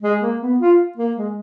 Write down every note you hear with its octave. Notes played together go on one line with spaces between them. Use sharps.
G#3
A#3
B3
F4
A#3
G#3